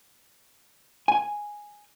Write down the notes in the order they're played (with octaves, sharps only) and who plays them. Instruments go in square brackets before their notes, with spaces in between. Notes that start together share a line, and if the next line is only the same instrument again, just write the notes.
[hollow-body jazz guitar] G#5